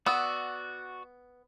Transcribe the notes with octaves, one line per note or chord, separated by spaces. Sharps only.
B3 F#4 D5 E6